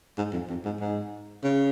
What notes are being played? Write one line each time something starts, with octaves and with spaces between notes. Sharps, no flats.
G#2
F2
F2
G#2
G#2
C#3